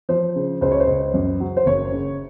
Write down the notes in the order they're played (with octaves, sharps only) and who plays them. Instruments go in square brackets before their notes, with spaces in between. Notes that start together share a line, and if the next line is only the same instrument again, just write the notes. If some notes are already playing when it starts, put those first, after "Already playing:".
[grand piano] F3 [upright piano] C5
[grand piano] C#3
[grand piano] C#2 [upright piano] C5
[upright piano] C#5
C5
[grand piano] C#2
F#2
F#3
[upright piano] C5
[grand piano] F#1 [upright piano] C#5
[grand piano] C#3